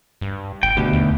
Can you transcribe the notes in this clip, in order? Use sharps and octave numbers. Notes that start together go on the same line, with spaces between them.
G2
G1 G5
D2 B2 G4
D#2